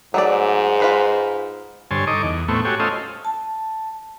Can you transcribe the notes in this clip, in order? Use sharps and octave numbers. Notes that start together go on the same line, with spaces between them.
G#2 F#3 A3 D5
F4 B4 C5
G2 D3 C5 C#5 G#5 A5
D#4 A4 D#5 C#6 D6
E2
A2 A3 B3 C4 C#6
F#4 G4 A4 C#5 G#5
A3 C#4 F4 A4 C5 D#5
A5